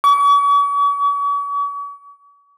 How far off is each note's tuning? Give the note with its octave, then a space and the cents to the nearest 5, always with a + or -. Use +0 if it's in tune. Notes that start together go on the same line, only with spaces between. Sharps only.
C#6 +45